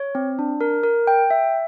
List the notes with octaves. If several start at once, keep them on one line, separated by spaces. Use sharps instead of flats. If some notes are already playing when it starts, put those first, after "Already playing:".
Already playing: C#5
C4
D4
A#4
A#4
G5
E5